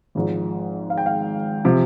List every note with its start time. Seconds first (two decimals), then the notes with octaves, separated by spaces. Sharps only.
0.15 G#1 G#2 F3
0.90 F5
0.98 G5
1.06 F5
1.65 C3 F3